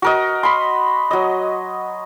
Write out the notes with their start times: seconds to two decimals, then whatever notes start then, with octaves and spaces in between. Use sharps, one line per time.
0.02 F#4 A#4 D#5
0.43 B5 C6
1.11 F#3 D#5